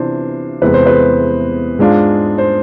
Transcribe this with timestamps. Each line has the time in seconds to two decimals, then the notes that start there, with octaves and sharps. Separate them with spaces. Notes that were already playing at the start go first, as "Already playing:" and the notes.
Already playing: C3 E3 B3 D4 F4 C5
0.61 E2 C3 G#3 B3 B4
0.74 C5
0.87 B4
1.79 G#2 G#3 D4 F4
2.38 C5